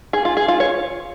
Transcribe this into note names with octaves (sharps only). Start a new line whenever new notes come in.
G#4
F4
G#4
F4
C#5